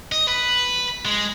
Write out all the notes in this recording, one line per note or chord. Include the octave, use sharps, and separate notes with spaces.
D#5
B4
G#3